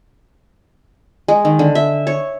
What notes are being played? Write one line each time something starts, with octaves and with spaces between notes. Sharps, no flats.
G#3
D#3
D3
E5
C#5